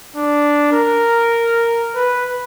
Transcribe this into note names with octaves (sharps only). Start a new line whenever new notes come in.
D4
A#4
B4